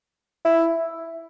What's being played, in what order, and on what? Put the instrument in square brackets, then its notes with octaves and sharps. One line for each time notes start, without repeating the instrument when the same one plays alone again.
[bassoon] E4